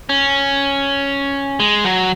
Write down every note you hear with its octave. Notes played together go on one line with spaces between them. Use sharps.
C#4
G#3
F#3